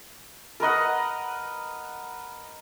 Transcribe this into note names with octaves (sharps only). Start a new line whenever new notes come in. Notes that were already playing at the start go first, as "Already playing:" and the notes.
A#4 B4 D#5 F#5